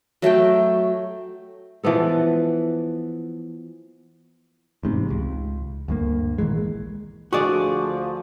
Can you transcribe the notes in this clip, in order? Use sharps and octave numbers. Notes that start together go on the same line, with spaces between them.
F#3 A3 A4 G5
E3 F3 B3 A4
A1 G#2 C3
C#2
D2 G2 A#3
A#1 D#3 E3 G#3
D2 D3 F3 F#4 G#4 D5